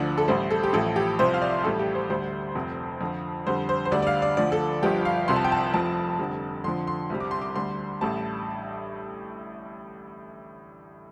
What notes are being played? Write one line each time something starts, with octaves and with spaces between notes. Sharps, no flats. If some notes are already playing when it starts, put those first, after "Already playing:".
Already playing: D2 D3 F3 D5
A4
A1 A2 G3 C5
A4
G4
A1 A2 F3 A4
G4
C2 C3 F3 C5
F5
D5
A1 A2 G3 A4
G4
C5
D2 D3 G3 C5
F1 F2 C3
F2 D3 F3
F2 D3 G3 C5
C5
C5
D2 D3 G3 D5
D5
F5
D5
D2 D3 F3 D5
A4
G1 G2 F3 G4
F5
C2 C3 F3 C6
A5
G5
A5
F1 F2 F3 A5
F1 F2 D3 G3
F2 D3 F3 C6
C6
C2 C3 G3
D6
C6
D6
D2 D3 G3 C6
A1 A2 G3 A5